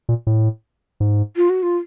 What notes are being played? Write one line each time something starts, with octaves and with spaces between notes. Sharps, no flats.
A#2
A2
G#2
F4
F#4
F4